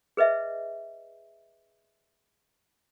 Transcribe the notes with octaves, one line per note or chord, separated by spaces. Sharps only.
G#4 B4 D#5 E5